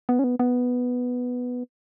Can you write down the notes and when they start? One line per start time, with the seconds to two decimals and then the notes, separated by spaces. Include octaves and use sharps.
0.09 B3
0.19 C#4
0.24 B3
0.39 B3